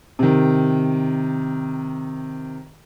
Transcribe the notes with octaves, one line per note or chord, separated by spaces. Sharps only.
C3 D#3